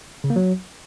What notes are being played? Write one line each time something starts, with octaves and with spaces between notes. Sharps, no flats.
C#3
A#3
F#3